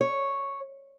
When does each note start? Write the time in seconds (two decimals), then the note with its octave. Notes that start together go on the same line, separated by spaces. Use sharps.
0.01 C#5